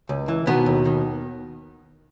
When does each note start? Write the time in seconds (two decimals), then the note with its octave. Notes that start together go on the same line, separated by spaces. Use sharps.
0.09 C#2
0.28 E3
0.47 B2 D#3 B3
0.66 D#2
0.85 D#3